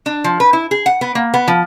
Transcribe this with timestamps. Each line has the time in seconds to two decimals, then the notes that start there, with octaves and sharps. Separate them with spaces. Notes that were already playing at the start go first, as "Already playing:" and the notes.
0.06 D4
0.24 F3
0.40 B4
0.53 E4
0.71 G#4
0.86 F#5
1.01 B3
1.15 A#3
1.34 B3
1.48 F3